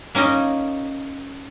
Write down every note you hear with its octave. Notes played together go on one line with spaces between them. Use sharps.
A#3 C#4 D#4 D#5